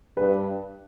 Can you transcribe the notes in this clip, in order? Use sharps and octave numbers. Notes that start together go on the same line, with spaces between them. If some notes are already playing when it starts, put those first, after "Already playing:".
G2 B4